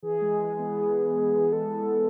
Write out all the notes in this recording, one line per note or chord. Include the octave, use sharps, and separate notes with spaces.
E3 G#4
G#3
B3
A4